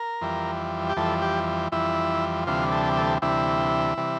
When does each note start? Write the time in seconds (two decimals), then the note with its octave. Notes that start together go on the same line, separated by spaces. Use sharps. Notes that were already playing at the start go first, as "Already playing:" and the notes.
Already playing: A#4
0.21 F2 E3 G3
0.89 G4
0.97 F2 E3 G3 A4
1.22 G4
1.72 F2 E3 G3 E4
2.47 D2 C3 E3 G3 F4
2.72 A4
2.97 A4
3.22 D2 C3 E3 G3 E4
3.97 C3 E3 G3